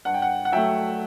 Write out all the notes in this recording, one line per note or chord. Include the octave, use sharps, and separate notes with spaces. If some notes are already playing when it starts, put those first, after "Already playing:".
G2 F#5
G5
F#5
F#5
F#3 A3 E5 G5